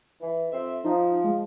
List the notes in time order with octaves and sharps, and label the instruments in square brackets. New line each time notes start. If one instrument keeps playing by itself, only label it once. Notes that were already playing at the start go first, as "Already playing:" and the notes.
[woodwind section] E3
F2 C4 E5
[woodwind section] F3 [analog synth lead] D#4
[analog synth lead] G#3